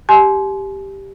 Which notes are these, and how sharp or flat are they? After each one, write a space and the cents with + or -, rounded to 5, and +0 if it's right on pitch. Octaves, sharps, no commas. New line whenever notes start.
G4 +0 G#5 +40 C6 +5